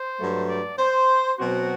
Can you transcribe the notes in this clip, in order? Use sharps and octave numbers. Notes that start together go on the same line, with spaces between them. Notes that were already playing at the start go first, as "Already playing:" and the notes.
Already playing: C5
G2 F#3 A3
D5
C5
B2 F#3 C4 F#4